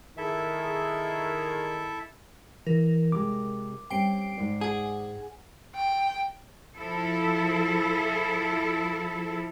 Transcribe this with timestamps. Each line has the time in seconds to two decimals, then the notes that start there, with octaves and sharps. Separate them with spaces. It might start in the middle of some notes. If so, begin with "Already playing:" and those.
0.17 D#3 E4 G#4 A4 E5
2.67 E3 A#4
3.12 C3 G#3 D6
3.90 G3 C4 C#4 G5 C7 D7
4.37 G#2 D5
4.61 G#4 F#5 G#5
5.75 G5
6.76 F3 E4 A4